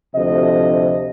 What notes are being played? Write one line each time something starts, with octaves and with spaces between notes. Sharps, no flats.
D2 C3 F3 A3 D#5